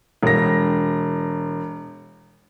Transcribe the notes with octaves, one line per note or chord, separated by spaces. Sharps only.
E1 A#6